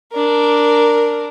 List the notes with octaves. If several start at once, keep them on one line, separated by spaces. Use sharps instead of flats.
D4 A#4